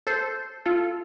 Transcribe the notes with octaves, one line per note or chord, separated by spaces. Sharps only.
A4 C5
F4 A4